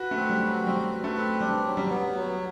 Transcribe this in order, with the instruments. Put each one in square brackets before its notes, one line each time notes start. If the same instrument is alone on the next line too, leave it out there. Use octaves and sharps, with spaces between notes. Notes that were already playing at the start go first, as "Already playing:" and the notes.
Already playing: [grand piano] F#4 [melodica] B4
[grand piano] A3
[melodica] C4
[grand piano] G3
[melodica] F#4
[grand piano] F#3
[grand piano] G3 [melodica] C4
[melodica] B4
[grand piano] A3
[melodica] C4
[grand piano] G3 [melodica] D4
[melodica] F#3
[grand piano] G3
[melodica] B3
F#3